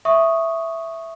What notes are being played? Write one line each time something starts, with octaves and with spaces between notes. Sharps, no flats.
E5 C#6 D#6